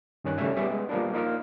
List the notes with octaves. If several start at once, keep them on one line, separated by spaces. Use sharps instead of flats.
G2 D#3 C#4 F#6
C#3 G3 A3 C#4 E5 G#5
G3 B3 G#4 D5 E5
G#3 B3
F3 G3 A#3 B3 D4
A#3 D#4 F4 D#5 F6